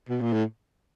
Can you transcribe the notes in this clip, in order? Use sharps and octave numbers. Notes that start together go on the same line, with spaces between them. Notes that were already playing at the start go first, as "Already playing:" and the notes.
B2
A#2
A2